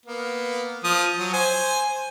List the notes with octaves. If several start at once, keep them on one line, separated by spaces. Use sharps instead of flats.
A#3 B3
F3 D#6
F#3
C5 G#5